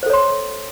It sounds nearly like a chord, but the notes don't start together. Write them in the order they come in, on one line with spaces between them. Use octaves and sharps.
C5 A4 C#5 C6